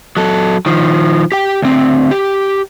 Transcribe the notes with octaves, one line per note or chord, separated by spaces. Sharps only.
F#3 A4
D#3 F3
G4 G5
D2 C4
G4